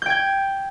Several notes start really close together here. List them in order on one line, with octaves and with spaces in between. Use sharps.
G6 G5 G#6